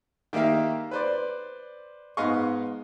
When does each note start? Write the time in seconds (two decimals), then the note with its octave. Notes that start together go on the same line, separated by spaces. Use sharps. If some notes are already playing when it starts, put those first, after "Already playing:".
0.33 D#3 A#3 G4 E5 F5
0.91 B4 C5 D5
2.17 G#2 B3 D#5 F5 C6 C#6